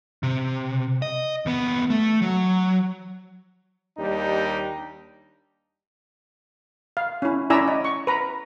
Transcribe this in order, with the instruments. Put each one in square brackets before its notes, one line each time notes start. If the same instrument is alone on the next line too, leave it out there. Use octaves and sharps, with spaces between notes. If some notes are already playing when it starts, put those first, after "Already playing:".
[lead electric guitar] C3
D#5
D#2 B3
A3
F#3
[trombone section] D#2 G3 D4 D#4
[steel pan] F5
C#4 E4
C#4 E4 D5 G#5 A#5 E6
D#5
C#6
B4 A#5 B5